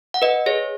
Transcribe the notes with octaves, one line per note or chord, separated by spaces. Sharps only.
F#5
B4 D#5
G#4 C#5